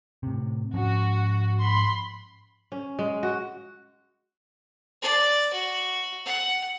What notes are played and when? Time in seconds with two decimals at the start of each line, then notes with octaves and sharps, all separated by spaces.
0.23 A2 C3
0.74 G#2 F3 C#4 F#4
1.62 B5 C6
2.72 C#4
2.99 G#3
3.23 F#4
5.02 D5
5.53 F#4
6.26 F#5